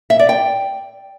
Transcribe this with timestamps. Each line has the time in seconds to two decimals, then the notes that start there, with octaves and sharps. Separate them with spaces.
0.10 E5
0.19 D5
0.29 G5